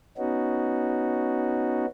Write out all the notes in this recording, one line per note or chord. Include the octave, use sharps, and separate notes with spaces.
B3 C#4 D#4 F#4